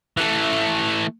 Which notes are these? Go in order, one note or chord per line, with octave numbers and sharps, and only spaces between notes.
E3 A3